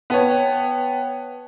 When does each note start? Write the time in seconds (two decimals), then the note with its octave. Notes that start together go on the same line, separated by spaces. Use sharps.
0.10 B3 B4 C#5 G5 A5